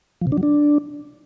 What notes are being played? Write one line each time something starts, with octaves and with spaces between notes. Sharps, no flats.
F3
C3
D4
F#3
D4